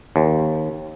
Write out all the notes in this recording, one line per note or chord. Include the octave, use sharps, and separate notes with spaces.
D#2